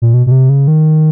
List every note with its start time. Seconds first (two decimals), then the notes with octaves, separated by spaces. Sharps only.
0.02 A#2
0.14 B2
0.27 B2
0.31 C3
0.49 C#3
0.68 D#3